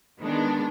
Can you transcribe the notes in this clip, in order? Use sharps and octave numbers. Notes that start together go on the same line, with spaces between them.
D#3 G#3 B3 D4